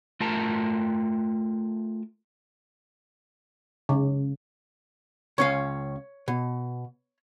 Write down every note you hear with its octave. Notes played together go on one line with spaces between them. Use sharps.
A3 F4 A#4 A5 A#5
C#3
C#2 C#4 C#5 F5
B2